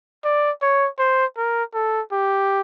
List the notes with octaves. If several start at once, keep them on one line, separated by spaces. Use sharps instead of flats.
D5
C#5
C5
A#4
A4
G4